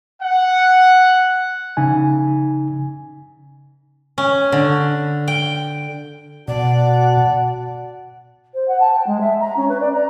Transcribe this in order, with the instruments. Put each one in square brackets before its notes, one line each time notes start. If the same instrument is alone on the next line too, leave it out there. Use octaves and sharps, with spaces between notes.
[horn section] F#5
[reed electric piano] C#3 D#4 G#5
[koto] C#4
D3
G5
[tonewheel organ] B2 [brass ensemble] F#4 F#5 A5 [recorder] D5
[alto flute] C5
F#5
A5
G5
G#3
E5
A#5
C#4
B4
D5
A#5